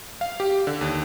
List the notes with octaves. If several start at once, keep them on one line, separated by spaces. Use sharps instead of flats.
F5
G4
D3
D#2